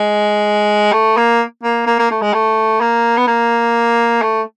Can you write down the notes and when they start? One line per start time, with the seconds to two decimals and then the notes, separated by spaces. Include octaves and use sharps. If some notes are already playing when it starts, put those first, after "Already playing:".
Already playing: G#3
0.93 A3
1.17 A#3
1.63 A#3
1.86 A#3
1.99 A#3
2.11 A3
2.22 G#3
2.34 A3
2.81 A#3
3.17 B3
3.27 A#3
4.22 A3